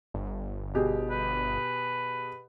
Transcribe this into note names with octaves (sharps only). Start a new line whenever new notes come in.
G1
B2 G4 G#4
B4